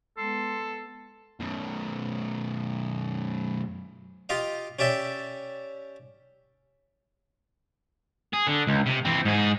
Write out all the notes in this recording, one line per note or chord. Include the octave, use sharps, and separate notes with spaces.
G#3 B3 A4 C6
F#2 B2
F4 G4 D#5 F5
C#4 G4 D5 E5 G5
G#4
D3
C#2
C3
E3 C4
G#2 G#4